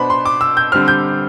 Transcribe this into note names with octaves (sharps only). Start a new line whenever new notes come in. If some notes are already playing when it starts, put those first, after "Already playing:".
Already playing: B2 B3 D4 C5 B5
C6
D6
E6
G6
D3 G3 C4 F6
G6